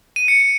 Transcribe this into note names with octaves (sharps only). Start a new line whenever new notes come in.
D#7
C#7